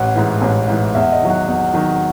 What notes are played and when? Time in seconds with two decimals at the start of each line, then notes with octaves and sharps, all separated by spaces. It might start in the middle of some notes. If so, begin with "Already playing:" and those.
Already playing: A1 F#5
0.15 G#2 E3
0.42 A1
0.68 G#2 E3
0.95 E2 E5
1.12 D#5
1.21 D#3 F#3
1.30 F#5
1.48 E2
1.73 D#3 F#3